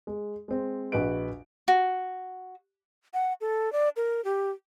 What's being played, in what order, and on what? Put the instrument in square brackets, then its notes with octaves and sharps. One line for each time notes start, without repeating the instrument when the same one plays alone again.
[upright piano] G#3
G#3 C4
A#1 F#4 B4 D#5 D7
[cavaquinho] F#4
[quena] F#5
A4
D5
A#4
G4